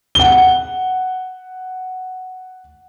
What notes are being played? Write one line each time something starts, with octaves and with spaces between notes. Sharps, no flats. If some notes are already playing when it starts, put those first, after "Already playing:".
F#5 G7